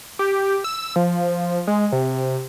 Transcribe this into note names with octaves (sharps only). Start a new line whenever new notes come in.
G4
E6
F3
G#3
C3